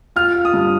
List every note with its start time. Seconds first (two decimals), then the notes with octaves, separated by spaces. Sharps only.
0.16 F4 F6
0.35 F4
0.45 D#6
0.54 G2